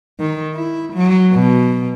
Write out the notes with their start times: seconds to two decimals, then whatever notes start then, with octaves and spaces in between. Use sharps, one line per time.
0.20 D#3
0.55 E4
0.93 F#3
1.33 B2